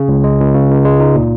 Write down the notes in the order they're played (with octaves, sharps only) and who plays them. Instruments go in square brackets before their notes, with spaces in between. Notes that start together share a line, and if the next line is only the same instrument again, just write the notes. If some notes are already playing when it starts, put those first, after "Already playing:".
Already playing: [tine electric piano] C#3
C#2
G#3
C#2
C#3
C#2
G#3
D#4
A#2